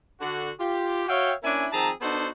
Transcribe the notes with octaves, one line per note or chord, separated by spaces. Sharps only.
D3 F#4
F4 G4
F#4 C#5 E5 F5 G5
A#3 C#4 D4 E4 E5 G#5
D#3 F3 C4 G#4 A5 A#5
B3 D4 D#4 F#4 A4 C5